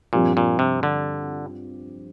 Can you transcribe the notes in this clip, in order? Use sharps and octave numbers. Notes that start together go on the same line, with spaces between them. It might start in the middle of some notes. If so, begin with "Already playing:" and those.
G2 A#2 F3 C4 G4
A#2
C3
D3